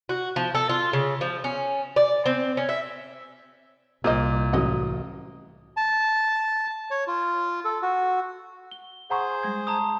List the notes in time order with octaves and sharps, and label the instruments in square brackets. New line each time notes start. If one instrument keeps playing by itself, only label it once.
[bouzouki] F#4
F3
A4
F4
C#3
F3
C#4
D5
C4
C#4
E5
[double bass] C2 [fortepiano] A#2 [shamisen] G4 C5 D#5
[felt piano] A1 F#3 D#6 [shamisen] F#4 D#5 F#5
[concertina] A5
C#5
F4
A4
F#4
[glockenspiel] G7
[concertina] G#4 C5 [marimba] F#5 A#5 C#6
[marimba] G3 G#3 G#6
[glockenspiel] A5 A#5 D#6